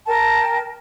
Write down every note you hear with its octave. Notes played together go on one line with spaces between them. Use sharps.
A#4 G5 A5